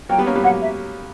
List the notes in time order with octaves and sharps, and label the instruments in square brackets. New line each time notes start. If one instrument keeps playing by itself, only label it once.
[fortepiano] F#3 A#3 [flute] G5
[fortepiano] G3 B3
A#3 C#4
G3 B3
[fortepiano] F#3 A#3 [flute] F#5
[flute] E5